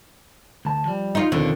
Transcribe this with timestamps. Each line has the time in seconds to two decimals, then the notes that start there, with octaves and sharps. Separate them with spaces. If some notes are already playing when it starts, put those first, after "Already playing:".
0.65 D2 A5
0.86 F3 G3
1.15 D#4 F4
1.32 D#2 B2 D3 F3 C4